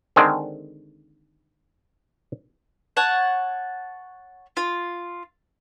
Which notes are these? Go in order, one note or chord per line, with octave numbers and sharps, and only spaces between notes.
D3 D#3 G#3 C4
C#5 F#5 A5
F4